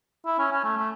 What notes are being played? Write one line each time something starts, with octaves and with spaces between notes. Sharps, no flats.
E4
C#4
C#4
A3
A3